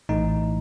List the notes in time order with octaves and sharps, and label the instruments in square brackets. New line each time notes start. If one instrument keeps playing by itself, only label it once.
[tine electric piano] A#1 A2 E3 A3 D#4